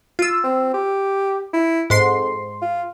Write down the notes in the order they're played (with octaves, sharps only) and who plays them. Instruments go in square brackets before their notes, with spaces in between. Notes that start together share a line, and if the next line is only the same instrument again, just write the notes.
[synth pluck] F4 E6
[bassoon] C4
G4
E4
[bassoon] F2 [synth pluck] G#2 C6 C7
[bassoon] F4